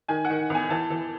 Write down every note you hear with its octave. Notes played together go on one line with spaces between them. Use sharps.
D#3 G#5
F#5
D#3
E2 G#5
E3 A5
E3